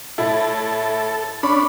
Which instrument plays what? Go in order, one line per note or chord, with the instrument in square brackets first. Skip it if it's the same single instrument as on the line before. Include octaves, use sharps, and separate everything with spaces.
[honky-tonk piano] A2 E4 [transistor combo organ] A4
[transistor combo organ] C#4 D4 [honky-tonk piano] B5